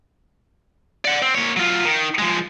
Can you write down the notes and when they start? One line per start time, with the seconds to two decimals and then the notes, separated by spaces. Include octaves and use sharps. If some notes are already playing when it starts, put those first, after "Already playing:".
1.05 D5 F#5
1.22 C4
1.35 A#3 C#5
1.56 F#3 F4
1.85 D#3
2.19 F3 G#3